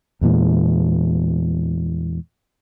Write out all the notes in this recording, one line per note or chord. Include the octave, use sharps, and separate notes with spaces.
E2 A#2 E3 G#3